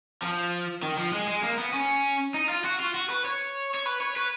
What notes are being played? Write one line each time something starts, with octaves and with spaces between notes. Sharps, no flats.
F3
D#3
F3
G#3
G#3
A#3
B3
C#4
D#4
F4
F#4
F4
F#4
B4
C#5
C#5
B4
C#5
B4